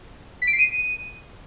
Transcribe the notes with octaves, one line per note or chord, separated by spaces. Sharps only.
B6
D7
C7
D#7